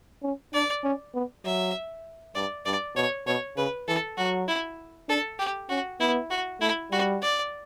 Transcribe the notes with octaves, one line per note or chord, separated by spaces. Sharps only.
C#4
D4 D5
C#4
B3
F#3 E5
G2 D5
G2 D5
B2 C#5
B2 C#5
C#3 B4
E3 A4
F#3 F#4
E4
D4 A4
G4
C#4 F#4
B3 E4
F#4
A3 E4
G3 F#4
D5